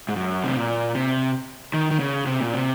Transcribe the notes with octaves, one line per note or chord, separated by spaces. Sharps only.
G#2
F#2
C3
A#2
C3
D#3
D#3
C#3
C3
A#2
C3